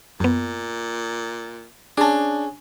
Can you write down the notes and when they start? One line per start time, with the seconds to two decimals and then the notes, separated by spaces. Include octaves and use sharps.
0.20 F#2 A#2 B3
1.97 C#4 D4 G#4 A5 D6